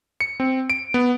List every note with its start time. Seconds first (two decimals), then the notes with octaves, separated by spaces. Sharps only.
0.21 C#7
0.40 C4
0.70 D7
0.94 B3